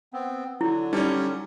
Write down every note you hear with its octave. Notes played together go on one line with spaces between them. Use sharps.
B3 C4
D3 F#3 E4
G3 C#4 D#4 D5